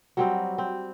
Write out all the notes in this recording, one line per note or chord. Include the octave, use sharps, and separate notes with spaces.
F#3 G3 C4
C4